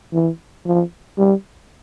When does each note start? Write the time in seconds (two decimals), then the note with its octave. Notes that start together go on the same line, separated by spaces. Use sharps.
0.13 E3
0.65 F3
1.18 G3